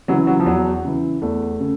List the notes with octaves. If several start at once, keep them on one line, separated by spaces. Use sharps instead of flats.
C#3 E3 F#3
F#3
F3
E2 F#3
C#3 E3
E2 A3
C#3